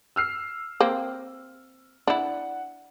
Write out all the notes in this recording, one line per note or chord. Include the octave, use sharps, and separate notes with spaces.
E6 F6 C7
A#3 C4
D4 E4 F#5